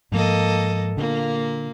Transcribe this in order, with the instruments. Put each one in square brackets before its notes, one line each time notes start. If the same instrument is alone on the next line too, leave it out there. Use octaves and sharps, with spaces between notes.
[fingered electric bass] G#2 F3 [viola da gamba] A#3 A4 D#5
[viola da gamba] A#2 A#3 [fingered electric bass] D3